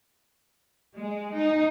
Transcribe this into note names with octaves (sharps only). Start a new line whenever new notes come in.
G#3
D#4